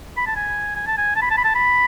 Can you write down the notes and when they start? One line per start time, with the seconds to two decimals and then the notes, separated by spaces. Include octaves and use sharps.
0.17 B5
0.27 A5
0.36 G#5
0.76 G#5
0.87 A5
0.98 G#5
1.16 A5
1.22 B5
1.31 A5
1.37 B5
1.44 A5
1.55 B5